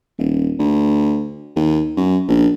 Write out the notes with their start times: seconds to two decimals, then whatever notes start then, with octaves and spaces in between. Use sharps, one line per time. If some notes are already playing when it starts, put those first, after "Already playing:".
0.19 D#1
0.59 D2
1.56 D#2
1.97 F#2
2.28 A#1